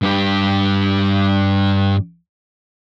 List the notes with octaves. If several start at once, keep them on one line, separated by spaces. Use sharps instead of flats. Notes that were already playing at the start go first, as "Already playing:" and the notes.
G2 G4